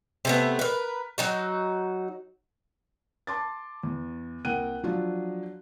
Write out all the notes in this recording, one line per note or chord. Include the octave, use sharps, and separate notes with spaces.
C3 A3 B3
A#4 B4
F#3 D#4 F#4
A5 C6 D6 A6
E2
C2 A#3 F#5 G5 F#6 D#7
F3 F#3 D4 F4